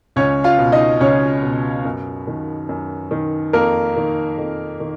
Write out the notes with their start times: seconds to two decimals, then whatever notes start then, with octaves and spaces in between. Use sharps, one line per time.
0.16 C#2 C#4 C#5
0.44 F4 F5
0.58 B2
0.72 D#4 D#5
1.00 C#2 C#4 C#5
1.43 B2
1.85 F#2
2.27 D#3
2.69 F#2
3.11 D#3
3.53 F2 A#3 A#4
3.96 D#3
4.38 F2
4.80 D#3